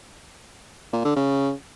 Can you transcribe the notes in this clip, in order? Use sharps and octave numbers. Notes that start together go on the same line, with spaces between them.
A#2
D3
C#3